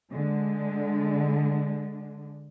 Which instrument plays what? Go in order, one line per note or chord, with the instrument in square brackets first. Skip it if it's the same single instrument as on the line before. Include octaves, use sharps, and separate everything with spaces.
[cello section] D3 G#3